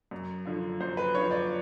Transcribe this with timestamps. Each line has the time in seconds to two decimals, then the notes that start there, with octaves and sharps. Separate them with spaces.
0.11 F#2
0.45 D3 F3
0.80 F#2 C5
0.97 B4
1.14 D3 F3 C#5
1.31 D5